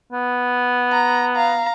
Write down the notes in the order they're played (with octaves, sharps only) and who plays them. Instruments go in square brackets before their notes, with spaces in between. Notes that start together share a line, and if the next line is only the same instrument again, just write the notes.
[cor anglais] B3
[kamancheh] A#5
F5 A#5